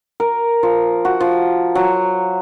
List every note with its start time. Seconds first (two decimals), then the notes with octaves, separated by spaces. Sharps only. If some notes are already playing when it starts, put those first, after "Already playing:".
0.20 A#4
0.63 F3
1.05 F#4
1.20 F3
1.75 F#3